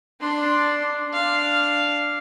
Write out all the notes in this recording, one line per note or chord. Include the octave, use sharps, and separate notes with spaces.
D4 C6
D4 F5